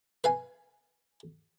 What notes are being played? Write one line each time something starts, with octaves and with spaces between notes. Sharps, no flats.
B4 F5 G#5